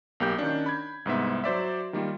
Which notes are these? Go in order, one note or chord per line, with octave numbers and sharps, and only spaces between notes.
B1 A#3 G4 G6
D#3 C#4 D4
B5 G#6
C2 G#2 B3 E5
F#3 C5 D5 E5
D#3 G3 A#3 F4